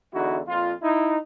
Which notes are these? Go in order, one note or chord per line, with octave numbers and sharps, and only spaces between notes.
E2 D3 D#4 E4 F#4
F2 A#2 F4
D#4 E4